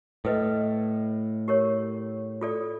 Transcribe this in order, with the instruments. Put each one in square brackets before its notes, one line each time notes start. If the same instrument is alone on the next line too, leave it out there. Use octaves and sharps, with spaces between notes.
[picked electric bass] A2 [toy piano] A4 B4 D#5
[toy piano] G4 A#4 C#5
F4 A4 D5